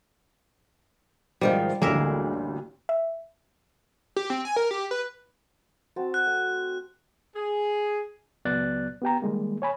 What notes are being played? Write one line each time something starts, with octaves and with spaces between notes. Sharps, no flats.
G#2 D#3 F3 G3
A1 D2 G#3 A#3 A#4 E5
E5
G4
C4
G#5
A#4
G4
B4
C4 F#4 A5
F#6
A3
G#4
C#2 F#3 B3 D5 F#6 A6
B3 G4 G5 A#5
D#3 G3 G#3 A#3
C#5 G#5 B5